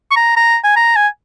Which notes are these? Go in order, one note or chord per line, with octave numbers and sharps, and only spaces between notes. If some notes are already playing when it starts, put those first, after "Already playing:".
C#6
A#5
A#5
G#5
A#5
G#5